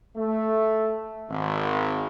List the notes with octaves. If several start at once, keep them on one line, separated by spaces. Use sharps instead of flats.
A3
G#1